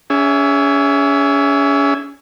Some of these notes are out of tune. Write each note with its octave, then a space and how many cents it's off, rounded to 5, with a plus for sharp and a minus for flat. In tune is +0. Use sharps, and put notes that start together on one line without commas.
C#4 +35 G#4 -10 E5 +5